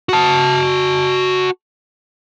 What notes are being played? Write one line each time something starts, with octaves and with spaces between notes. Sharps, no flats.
F#4 A5